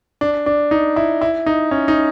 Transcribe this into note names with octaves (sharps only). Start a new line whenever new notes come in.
D4
D4
D#4
E4
E4
D#4
C#4
D#4